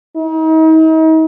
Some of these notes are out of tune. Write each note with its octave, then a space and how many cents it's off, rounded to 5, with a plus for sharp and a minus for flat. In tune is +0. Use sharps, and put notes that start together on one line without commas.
D#4 +40